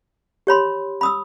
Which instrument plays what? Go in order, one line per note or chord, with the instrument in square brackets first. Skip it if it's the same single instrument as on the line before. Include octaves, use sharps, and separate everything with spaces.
[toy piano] G4 C#5 B5 C6
B5 D#6 E6